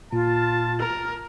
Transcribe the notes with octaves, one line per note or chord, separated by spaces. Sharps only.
A#2 F4 A5
A#4